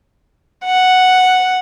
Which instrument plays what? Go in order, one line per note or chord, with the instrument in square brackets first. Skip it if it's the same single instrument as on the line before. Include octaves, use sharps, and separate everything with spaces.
[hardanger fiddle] F#5